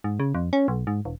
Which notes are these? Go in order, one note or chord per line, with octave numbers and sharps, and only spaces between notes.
G#2
C#3
F2
C#4
B1
G#2
E1